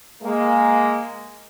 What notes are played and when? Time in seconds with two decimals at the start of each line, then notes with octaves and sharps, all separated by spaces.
0.23 G#3 A#3